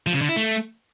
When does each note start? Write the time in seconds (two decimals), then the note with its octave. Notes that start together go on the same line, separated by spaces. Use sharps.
0.07 F3
0.14 C#3
0.21 D3
0.29 E4
0.36 A3